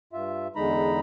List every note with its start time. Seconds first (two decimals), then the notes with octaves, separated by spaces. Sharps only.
0.13 G2 F4 E5
0.56 E2 D3 G#3 D#4 A#5 B5